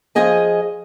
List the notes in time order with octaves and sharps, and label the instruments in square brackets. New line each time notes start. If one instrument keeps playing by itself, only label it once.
[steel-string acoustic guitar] F3 G#4 D#5 G#5